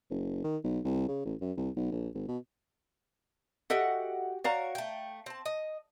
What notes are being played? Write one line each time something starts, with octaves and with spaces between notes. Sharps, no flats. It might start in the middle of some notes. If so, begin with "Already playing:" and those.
F#1
D#3
B1
C2
C#3
A1
F#2
C2
B1
A#1
G#1
B2
F#4 G4 A4 D#5 E5 F#5
F#4 A#4 C#5 D5 F5 A#5
A3 G5
C4 A5
D#5